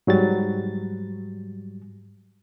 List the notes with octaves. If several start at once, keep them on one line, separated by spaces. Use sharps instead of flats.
G#2 F#3 G3 A6